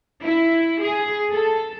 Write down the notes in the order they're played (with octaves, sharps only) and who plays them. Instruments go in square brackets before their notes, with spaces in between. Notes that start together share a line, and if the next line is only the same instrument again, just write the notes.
[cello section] E4
G#4
A4